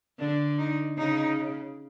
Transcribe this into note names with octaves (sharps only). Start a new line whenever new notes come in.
D3 D4
D#4
C#3 D#4